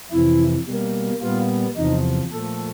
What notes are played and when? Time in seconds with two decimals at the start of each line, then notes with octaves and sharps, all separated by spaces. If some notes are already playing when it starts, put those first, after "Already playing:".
0.11 F2 C3 E3 E4
0.66 B2 G3 A#3
1.21 A#2 G3 B3 F4
1.76 E2 C3 F3 D#4
2.32 A#2 F3 A3 A4